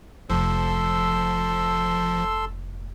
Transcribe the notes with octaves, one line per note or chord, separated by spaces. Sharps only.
F1 F3 A4 C6 E6